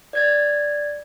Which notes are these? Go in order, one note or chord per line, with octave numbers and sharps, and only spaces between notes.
D5 G#6 A6